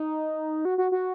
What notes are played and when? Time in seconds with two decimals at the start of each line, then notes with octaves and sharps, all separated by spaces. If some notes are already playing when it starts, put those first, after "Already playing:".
Already playing: D#4
0.65 F#4
0.78 F#4
0.92 F#4